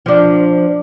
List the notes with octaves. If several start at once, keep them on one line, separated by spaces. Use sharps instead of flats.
F3 D4